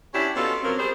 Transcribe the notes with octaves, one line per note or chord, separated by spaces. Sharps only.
C#4 D4 E4 G4
B2 C#4 F4 G4 A4
F#2 F3 F#3 C4 A#4
G3 G#4 C5